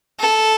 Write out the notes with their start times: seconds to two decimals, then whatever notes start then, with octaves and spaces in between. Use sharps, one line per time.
0.20 A4